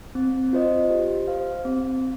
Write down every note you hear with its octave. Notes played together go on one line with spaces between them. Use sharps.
C4
F4 C5 D#5
G4
C5 F5
C4